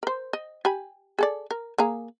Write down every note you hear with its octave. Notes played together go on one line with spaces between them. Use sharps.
A#4 C5
D#5
G4 G#5 B5
G#4 A4 D5
A#4
A#3 G#4 A#5